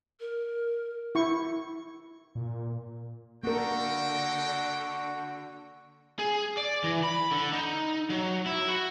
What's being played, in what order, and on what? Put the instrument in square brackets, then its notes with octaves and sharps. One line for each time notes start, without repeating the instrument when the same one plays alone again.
[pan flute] A#4
[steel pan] E4 C#6
[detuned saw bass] A#2
[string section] D3 [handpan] A#3 A#4 [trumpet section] D4 D#5 G5 [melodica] F#4
[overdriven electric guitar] G#4
D5
E3
B5
D3
D#4
F#3
E4
F#4